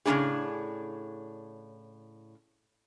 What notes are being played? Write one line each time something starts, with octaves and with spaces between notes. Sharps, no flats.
A2 C#3 E3 B3 D4 G#4